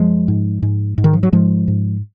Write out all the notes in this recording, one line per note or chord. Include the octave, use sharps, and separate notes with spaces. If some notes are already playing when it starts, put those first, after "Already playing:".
Already playing: F#2 F3 G#3
G#2
G#2
G#2
D#3
F3
F#3
G#2 F3 G#3
G#2